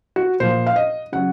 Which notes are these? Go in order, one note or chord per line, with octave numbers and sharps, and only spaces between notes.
F#4
A#2 F3 C5
F5
D#5
C#3 F#3 F#5